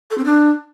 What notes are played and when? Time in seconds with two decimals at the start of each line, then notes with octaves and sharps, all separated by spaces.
0.10 A4
0.17 C4
0.24 D4